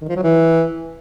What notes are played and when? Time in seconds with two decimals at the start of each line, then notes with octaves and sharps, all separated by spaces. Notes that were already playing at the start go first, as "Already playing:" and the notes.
0.01 D#3
0.09 F3
0.16 F#3
0.23 E3